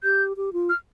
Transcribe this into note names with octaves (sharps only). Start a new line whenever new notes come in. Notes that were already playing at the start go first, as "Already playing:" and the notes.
G4 G6
G4
F4
F6